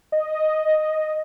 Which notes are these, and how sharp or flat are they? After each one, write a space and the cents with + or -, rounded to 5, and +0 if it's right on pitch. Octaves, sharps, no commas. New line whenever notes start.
D#5 -5